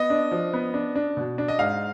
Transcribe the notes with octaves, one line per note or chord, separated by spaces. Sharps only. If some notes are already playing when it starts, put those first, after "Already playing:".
Already playing: B3 D#5
D4
F3
B3
D4
D4
B2
D4
D#5
G#2 F5